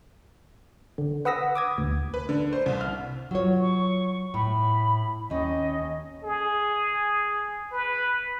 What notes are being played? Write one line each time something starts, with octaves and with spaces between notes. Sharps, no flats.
D3
B4 F#5 D#6 E6 A#6 B6
D6 D#6 G#6
D2
B4
D3
C5
C2
F6
F#3 F4 C#5
C#6
A2 B5
D#2 C#4 D#5
G#4
B4